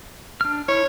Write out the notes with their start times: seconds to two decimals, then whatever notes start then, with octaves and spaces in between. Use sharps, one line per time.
0.41 D4 F6
0.68 E4 C#5